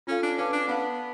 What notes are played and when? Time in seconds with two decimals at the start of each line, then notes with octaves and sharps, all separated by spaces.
0.07 C#4 F4 A4 F5
0.23 D4
0.38 C#4 B4 F5 A5 D6
0.53 D4
0.68 B3 B4 F5 A5